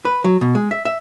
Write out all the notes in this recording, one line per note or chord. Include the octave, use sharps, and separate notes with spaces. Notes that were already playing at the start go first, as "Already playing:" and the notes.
B4
F#3
B2
G#3
E5
E5